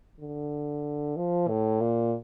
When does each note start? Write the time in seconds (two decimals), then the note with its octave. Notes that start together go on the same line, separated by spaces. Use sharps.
0.20 D3
1.17 F3
1.48 A2
1.81 A#2